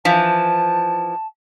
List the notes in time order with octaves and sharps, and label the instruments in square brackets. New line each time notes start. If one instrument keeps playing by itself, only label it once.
[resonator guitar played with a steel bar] E3 F3 [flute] A5